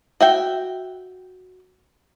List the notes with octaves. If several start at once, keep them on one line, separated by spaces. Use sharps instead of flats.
F#4 E5 G5